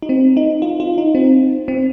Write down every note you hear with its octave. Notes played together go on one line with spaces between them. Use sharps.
D#4
C4
D#4
F4
F4
D#4
C4
C4